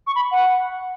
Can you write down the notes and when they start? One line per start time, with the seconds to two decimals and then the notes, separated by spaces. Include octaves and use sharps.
0.07 C#6
0.15 B5
0.32 F#5